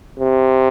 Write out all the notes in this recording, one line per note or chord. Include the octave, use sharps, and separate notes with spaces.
C3